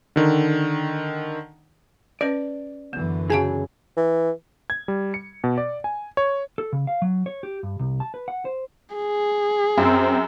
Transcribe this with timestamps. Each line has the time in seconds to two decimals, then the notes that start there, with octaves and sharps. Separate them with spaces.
0.16 D3 D#3
2.21 C#4 B4 D5 D#5
2.93 F#2 D3 E3 B3
3.30 C#3 F#4 G#4 G#5 A5
3.96 E3
4.70 G#6
4.88 G3
5.14 C#7
5.44 B2
5.58 D5
5.84 G#5
6.17 C#5
6.58 A4
6.73 C#3
6.87 F5
7.02 F#3
7.26 C#5
7.43 G4
7.63 G2
7.80 C2
8.00 A5
8.14 B4
8.28 F#5
8.45 C5
8.95 G#4
9.77 F#2 C4